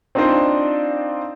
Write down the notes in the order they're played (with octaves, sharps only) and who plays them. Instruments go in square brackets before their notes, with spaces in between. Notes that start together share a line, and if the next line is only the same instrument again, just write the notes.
[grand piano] C4 D4 D#4 F4 C5 D5